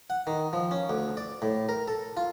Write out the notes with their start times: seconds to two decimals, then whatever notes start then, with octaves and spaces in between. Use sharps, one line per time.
0.10 F#5
0.27 D#3
0.53 F3
0.71 C#4
0.90 D2
1.17 D5
1.42 A2
1.69 A#4
1.88 A4
2.17 F4